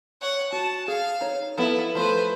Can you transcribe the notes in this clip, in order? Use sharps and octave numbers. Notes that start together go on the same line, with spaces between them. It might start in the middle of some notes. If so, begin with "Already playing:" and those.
C#5 F#5
F#4 A5
G#4 F5
D#4 C#5
F3 B3 E4 A4
F3 A3 B4 C5